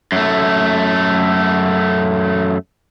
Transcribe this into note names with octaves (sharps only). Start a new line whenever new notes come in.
F#2 A3